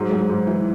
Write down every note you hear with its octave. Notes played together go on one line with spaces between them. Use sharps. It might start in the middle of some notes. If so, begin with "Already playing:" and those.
Already playing: G#2 F#3
G#2
G#2
E3